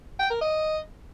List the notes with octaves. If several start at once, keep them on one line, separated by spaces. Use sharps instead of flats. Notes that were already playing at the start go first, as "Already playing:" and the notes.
G5
A#4
D#5